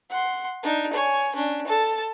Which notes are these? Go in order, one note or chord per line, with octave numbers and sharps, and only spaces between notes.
F#5 C6
D4 D#4
C#5 G#5
C#4 D4
A4 A5